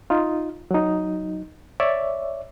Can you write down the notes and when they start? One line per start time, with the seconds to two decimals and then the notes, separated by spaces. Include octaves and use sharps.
0.10 D#4 F4
0.71 F#3 D#4
1.80 C#5 D5 E5